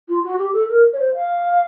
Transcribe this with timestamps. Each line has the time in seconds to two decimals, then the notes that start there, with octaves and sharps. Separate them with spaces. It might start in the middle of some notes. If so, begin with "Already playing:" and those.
0.08 F4
0.23 F#4
0.38 G4
0.53 A4
0.69 A#4
0.93 C#5
0.99 C5
1.15 F5